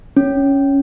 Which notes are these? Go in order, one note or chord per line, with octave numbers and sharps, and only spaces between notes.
C#4